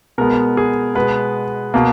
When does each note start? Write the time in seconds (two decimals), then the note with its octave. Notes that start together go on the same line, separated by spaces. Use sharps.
0.18 B2 G#3 B3 A#4
0.57 G#4
0.95 B2 G#3 B3 B4
1.74 B2 A#3